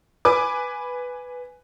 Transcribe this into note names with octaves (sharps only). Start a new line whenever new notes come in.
B4 G#5 D6